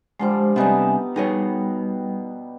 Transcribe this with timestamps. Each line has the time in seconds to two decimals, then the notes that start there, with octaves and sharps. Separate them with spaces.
0.20 D3 F3 G3 G#3 C5
0.56 C3 G3 B3 D4 D#4 E5 G#5
1.16 B2 G3 D#4 G#4 C#5